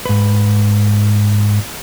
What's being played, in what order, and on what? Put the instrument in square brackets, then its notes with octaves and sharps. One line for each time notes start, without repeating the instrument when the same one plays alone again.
[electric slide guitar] G#2 B4